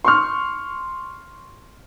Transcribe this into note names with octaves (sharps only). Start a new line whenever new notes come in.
C6 C#6 F6